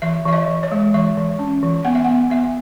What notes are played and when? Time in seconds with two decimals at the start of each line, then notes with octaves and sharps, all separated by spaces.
0.02 E3 E5
0.25 E3 E5
0.33 D#5
0.48 E3
0.63 C#5
0.72 G#3
0.94 E3 E5
1.17 E3
1.39 C#4
1.63 E3
1.85 B3 F#5
1.95 E5
2.05 B3 F#5
2.30 B3 E5